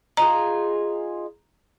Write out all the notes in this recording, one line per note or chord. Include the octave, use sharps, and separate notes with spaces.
D#4 F4 G#4 A#5